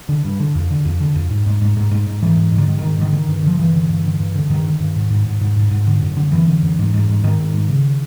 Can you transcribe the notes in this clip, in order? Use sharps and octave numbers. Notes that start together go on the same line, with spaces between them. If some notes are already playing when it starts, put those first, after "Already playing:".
D3
G2
D3
F2
D3
F2
D3
F2
G#2
G#2
G#2
G#2
G#2
G#2
G#2 E3
G#2
G#2
D3
G#2 D#3
G#2 D#3
G#2 D#3
D3 D#3
G2
D3 F3
G2 E3
D3
G2
D3
G2
D3
G2 D#3
D3
G2
G#2
G#2
G#2
G#2
G#2
G#2
D3
F#2
D3
F#2 E3
D3
F#2
G#2
G#2
G#2
G#2 D#3
G#2
G#2
C#3